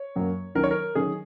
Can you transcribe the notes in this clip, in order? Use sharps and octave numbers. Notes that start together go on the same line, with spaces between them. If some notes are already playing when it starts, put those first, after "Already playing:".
Already playing: C#5
F#2 F#3 A#3
D#3 F#3 C#4 A#4
C#5
A#4
D#3 F#3 C#4 G#4